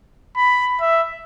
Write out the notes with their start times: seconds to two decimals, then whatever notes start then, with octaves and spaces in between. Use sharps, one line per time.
0.36 B5
0.81 E5